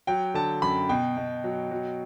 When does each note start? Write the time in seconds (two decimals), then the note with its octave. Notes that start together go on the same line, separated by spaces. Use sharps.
0.07 F#3 G5
0.34 D3 A5
0.62 F#2 B5
0.89 B2 G5
1.17 B2
1.44 F#3
1.71 F#3